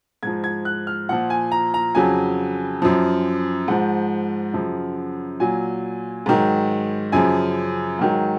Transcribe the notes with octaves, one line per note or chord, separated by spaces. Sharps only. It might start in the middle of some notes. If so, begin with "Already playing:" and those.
G#2 F3 G#6
G#6
F#6
F6
A#2 F3 F#5
G#5
A#5
A#5
F2 C#3 F#3 G#5
F#2 F3
G#2 F3 F#5
F#2 C#3 F3
A#2 F#3 G#5
G#2 D#3 F#3
F#2 C#3 F3 G#5
G#2 D#3 F#3